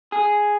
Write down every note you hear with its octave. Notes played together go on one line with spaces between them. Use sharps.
G#4